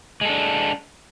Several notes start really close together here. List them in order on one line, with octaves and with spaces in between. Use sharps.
G#3 A4 D4